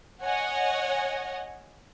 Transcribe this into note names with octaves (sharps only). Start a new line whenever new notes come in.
C#5 D#5 F#5 G#5